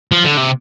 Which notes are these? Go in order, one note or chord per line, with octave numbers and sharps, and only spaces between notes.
F3
D3
C3